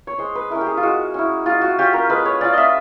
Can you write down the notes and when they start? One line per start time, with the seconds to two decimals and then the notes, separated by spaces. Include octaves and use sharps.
0.07 C#5
0.18 G#3 C5
0.35 B4
0.50 C#4 E4 A#4
0.61 G4
0.66 G#4
0.77 F4
0.83 G#3 F#4
1.14 C#4 E4
1.46 G#3 F4
1.61 F#4
1.78 C#4 F4 G4
1.93 A#4
2.10 G#3 B4
2.26 C#5
2.41 C#4 F4 D5
2.53 D#5 E5